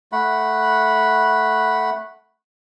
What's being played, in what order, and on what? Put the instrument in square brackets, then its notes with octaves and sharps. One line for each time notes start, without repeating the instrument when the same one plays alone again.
[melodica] A3 F#5 B5